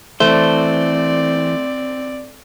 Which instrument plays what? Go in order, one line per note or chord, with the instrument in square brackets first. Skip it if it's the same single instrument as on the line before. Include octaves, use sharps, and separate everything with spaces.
[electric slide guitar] E3 [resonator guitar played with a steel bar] A3 [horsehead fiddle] C4 D5 [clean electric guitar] C5